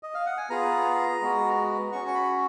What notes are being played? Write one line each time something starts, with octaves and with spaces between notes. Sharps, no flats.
D#5
F5
F#5
G#5
B3 F4 G#4 A#5
G#3 B3 F#4
C#4 F#4 C#6
C#6
B5